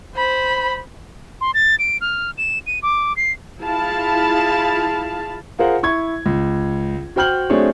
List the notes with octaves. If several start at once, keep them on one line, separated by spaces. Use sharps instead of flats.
C5 B5
C6
A6
D7
F6
E7
D#7
D6
C7
E4 F4 G#4 F5 A5 B5
F4 G#4 A#4 C5 F#5
E4 C#6 G#6
C#2
F#4 C5 G5 F6 G6 F#7
F#3 A3 C4 D4 G#4 C#5